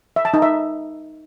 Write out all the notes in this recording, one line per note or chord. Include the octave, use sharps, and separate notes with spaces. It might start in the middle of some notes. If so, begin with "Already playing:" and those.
E5
A5
D#4
E5